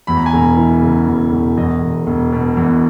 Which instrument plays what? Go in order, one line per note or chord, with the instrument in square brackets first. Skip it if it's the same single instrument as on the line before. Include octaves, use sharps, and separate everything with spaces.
[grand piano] E2 B5
A#5
G#5
E1 A#5
E3
C#3
E2
E1
E2 D#5
E1
E1
B2
E2